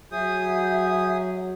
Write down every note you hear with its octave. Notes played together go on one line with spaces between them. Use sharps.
F#3 G#4 E5 D#6 G6